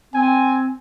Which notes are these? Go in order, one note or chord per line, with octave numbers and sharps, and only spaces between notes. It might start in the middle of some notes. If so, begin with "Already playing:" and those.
C4 G#5